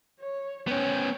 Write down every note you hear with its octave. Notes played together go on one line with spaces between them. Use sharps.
C#5
B3 C#4 C#5 G5